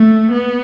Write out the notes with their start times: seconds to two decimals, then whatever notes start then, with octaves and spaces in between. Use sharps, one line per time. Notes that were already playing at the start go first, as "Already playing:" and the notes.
Already playing: A3
0.32 B3